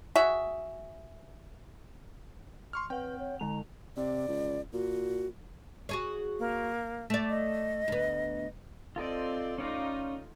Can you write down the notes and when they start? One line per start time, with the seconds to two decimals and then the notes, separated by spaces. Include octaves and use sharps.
0.16 F#4 G#4 E5
2.73 C6 C#6 F6
2.90 C4 B4 F#5 G5
3.19 C#5
3.40 D3 G#3 A#5 F7
3.97 C3 D5
4.28 C#2
4.73 A#2 F#4
5.89 F#4 G#4 C#5
6.39 A#3
7.10 A3 D5
7.30 D#5
7.88 D2 B3
8.96 C4 F4 A4 D5 D#5
9.58 A3 C#4 D#4 F4 D5 F5